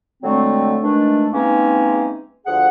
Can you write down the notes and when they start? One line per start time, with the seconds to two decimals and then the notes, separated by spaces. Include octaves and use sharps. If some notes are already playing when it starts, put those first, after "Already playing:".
0.23 D3 F#3 G#3 A3 C4
0.83 D#2 E3 G#3 A3 D4
1.33 E3 G#3 A#3 C4 C#4 D#4
2.47 D2 F3 G#4 F#5